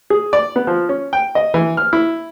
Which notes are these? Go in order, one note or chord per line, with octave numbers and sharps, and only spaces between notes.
G#4
D5
B3
F3
C#4
G5
D#5
E3
F6
E4